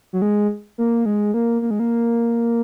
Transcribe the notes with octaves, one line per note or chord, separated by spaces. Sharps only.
F#3
G#3
A#3
G#3
A#3
A#3
G#3
A#3